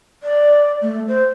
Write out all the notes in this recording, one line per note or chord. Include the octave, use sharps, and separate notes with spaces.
D5
A3
C5